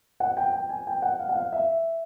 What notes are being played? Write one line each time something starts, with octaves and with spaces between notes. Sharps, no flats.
F#5
G5
G5
G#5
G5
F#5
F5
F#5
F5
E5